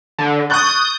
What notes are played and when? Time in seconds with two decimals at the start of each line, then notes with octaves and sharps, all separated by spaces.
0.19 D3
0.50 C#6 D#6 F#6 G6 A6